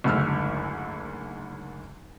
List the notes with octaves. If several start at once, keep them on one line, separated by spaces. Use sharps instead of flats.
F#1 D2 G#2 E6 F6